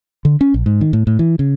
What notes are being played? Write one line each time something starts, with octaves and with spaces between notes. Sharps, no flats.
D3
C#4
A#1
G#2
D#3
A2
A2
E3
C#3